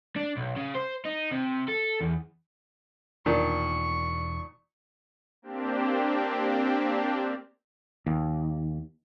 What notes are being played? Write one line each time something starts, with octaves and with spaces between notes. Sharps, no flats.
D4
B1
C#3
C5
D#4
C3
A4
E2
E1 A#2 D#3 D4 C#6
A#3 C4 D4 G4
D#2